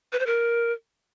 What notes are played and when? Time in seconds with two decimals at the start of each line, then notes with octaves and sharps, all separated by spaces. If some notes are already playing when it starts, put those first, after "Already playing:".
0.12 B4
0.19 C5
0.26 A#4